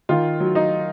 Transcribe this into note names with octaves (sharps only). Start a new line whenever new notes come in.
D#3 F4
F#3
D#4